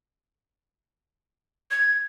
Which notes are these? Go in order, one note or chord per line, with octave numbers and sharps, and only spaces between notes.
G#6